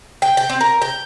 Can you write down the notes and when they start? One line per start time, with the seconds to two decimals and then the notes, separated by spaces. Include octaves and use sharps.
0.22 G5
0.37 G5
0.50 C4
0.61 A#4
0.82 G5